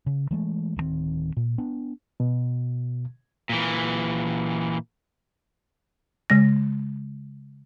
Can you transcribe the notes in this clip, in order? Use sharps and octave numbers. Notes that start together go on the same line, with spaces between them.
C#3
E3 G#3 A3
D1 G2 D#3 C4
A#2
B3 D4
B2
A#2 E3
C#3 G#3 A#6